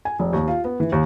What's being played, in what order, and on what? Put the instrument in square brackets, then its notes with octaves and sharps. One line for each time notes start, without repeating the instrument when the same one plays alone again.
[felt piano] G#5
F1
D#2
F4
B3
E3
D#2